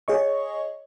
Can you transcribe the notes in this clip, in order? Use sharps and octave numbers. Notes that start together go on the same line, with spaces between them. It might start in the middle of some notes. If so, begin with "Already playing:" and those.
G#4 C#5 D#5 C#6